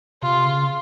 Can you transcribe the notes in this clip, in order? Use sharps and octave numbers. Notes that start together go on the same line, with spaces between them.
C3 F4
C#3